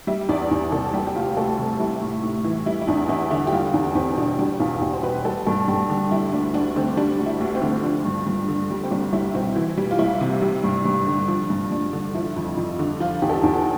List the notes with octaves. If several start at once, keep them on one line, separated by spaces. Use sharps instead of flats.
G3 E5
E2 D5
E2
C3 A4
G3 G4
G4
D2 F4
D2 A4
C3
G3 E4
A2
A2
E3
G3 E4
E4
E2 D4
E2 E4
D3 E4
G4
G3 F4
E2
E2 C4
B2 D4
G3 D4
E2 F4
E2 G4
C5
B2 B4
G3 A4
G2 A4
G2 G4
D3
G3 E4
D2 D4
D2 D4
D3 C4
G3 D4
D2
E4
D2
C4
D3
F3 D4
G2
G2
D3
G3
C4
C2 D4
C2 E4
B2 C4
E3
G3
F4
C2 E4
C3
G3
G2
G2
D3
F3 D4
G2
G2 D4
D3
F3 E4
F2
F2
D3
F3 F4
E2 G4
A4
G4
E2